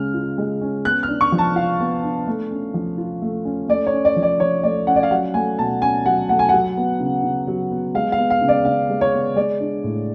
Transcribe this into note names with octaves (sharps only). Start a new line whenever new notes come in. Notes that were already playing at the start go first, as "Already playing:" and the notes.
Already playing: C#3 G#3 C#4 F6
F4
G#3
C#4
B3 F#6
F6
D4
C#6
F3
A5
F4 F5
B3
D4
A3
C#4
F3
F4
A3
C#4
A3 D5
C#5
C#4
D5
F3
D5
F3 C#5
A3 D5
C#4 F#5
D5
F5
F#3 F#5
A3 G#5
B2 A5
C#4 G#5
F#3 F#5
A3 F#5
G#5
F#3 F#5
B3
C#3
C#3
F#3
B3
G#3 F5
F5
B3
F5
C#3
D5
C#3 F5
G#3
C#5
B3
G#3 D5
D4
A2